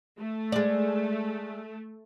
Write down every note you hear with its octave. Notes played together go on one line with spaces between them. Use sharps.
A3
G#3 D5